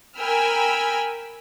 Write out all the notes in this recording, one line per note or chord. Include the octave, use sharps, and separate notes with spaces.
A#4 G5 G#5 B5 E6 F6